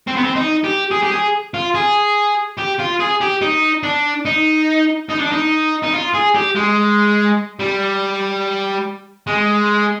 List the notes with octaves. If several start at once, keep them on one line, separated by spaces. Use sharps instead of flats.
C4
B3
C4
D#4
G4
G#4
G4
G#4
F4
G#4
G4
F4
G#4
G4
D#4
D4
D#4
D#4
D4
D#4
D#4
F4
G#4
G4
G#3
G3
G#3